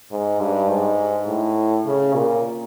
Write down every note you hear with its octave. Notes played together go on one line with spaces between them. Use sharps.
G#2
G2
G#2
A2
C#3
A#2